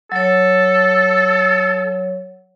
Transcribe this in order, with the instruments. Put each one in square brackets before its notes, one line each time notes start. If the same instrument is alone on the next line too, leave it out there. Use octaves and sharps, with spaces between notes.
[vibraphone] F#3 C#5 [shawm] A4